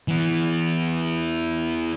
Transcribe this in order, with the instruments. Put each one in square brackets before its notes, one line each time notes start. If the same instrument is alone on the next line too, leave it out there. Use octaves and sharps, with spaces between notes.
[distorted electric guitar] E3 B3